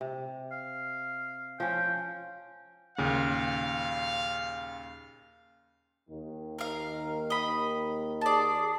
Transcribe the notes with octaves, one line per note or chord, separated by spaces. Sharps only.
C3
F5
F3 C#4 G5
D#2 A#2 C#3 F5
D#2 D#3
A#4 F5
D#5 B5
G#4 D5 A5